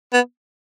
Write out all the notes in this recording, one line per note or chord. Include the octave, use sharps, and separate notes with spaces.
B3